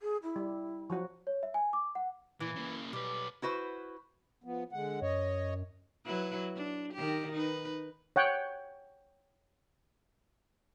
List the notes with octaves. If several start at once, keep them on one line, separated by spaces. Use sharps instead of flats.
G#4
E4
G3
F3 F#3 F#4
C#5
E5
G#5
D6
F#5
A#2 E3
C#3 A#3
B1 G3 B4
E4 F#4 B4 C5
F3 B3
D3 G#3 F#5
F#2 C#5 D#5
F#3 E4 B4
D4
D#3 G4
D#4 B4
C#5 F#5 G5